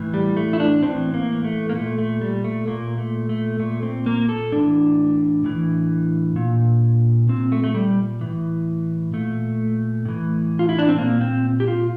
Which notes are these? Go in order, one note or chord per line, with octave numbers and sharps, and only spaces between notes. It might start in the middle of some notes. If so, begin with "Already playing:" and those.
Already playing: A2 E3
G3
A3
E4
D4
A2 E3 C4
A#3
A3
A#3
A#2 A3
A3
G3
A3
A#2 A#3
A3
A3
A#2 A3
C4
A#3
A4
A2 E3 D4
A2 E3
A#2
A#2 C4
A3
A3
G3
A2 E3
A#2 A3
A2 E3
F4
E4
D4
C4
A#2 A#3
C4
G4
F4